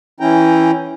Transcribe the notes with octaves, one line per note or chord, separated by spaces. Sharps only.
E3 C#4 E4 G5 A#5